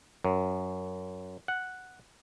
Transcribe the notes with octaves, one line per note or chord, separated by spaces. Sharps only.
F#2
F#5